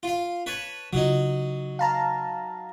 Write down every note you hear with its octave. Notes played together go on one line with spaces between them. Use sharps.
F4 F5
B4 C#5 A5
C#3 F#3 D#4 F4
F5 A5 A#5